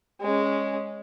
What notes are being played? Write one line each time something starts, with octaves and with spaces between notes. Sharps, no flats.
G#3 C#4